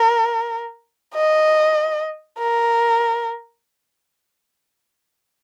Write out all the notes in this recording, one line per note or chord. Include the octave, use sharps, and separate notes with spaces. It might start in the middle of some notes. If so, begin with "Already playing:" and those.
Already playing: A#4
D#5
A#4